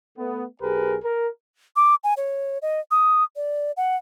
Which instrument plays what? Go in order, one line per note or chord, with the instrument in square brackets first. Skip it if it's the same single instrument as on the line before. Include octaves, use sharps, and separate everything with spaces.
[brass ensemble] A3 B3
B1 G4 G#4 A#4 B4
A#4
[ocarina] D6
G#5
C#5
D#5
D#6
D5
F#5